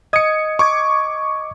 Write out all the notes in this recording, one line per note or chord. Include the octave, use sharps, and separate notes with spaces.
D#5 D#6 G#6 C#7
C#6 D6 G#6